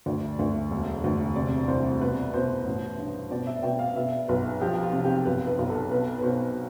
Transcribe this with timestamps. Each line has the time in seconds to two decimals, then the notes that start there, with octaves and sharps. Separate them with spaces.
0.06 D2 D5
0.39 D2
0.71 E1
1.04 D2
1.36 C3 D5
1.68 C2 C5
2.01 B2 B4
2.33 B2 C5
2.65 A1
2.98 G2
3.31 B2 D5
3.47 E5
3.63 B2 G5
3.79 F5
3.95 B2 E5
4.28 B1 B4
4.61 F3 G4
4.83 F4
4.93 C3
5.05 G4
5.25 B1 B4
5.47 B4
5.59 B1
5.70 A4
5.91 B2 B4
6.18 B4
6.23 B2 C5